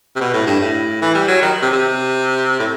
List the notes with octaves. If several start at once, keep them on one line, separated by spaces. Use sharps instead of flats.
C3
B2
A2
G2
A2
E3
G3
F#3
D#3
C3
C3
A2